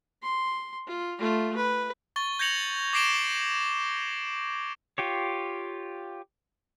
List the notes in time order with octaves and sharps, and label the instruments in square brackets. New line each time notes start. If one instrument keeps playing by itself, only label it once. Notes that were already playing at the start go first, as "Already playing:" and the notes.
[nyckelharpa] C6
F4
A3 F4
B4
[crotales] C#6 A6 G7
G6 G#6 A#6 C#7 F7 F#7
D6 A#6 C7 D7 E7 G7
[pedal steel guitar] F4 G4 C#5